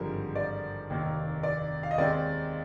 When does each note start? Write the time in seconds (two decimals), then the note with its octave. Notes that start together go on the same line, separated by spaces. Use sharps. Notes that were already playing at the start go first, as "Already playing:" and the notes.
Already playing: G#1 G2 D3 F3 G#3 A#4
0.36 D5
0.89 F1 D#2 D#3 A#3
1.43 D5
1.83 F5
1.91 D#5
1.98 D#2 D#3 G#3 C4 D5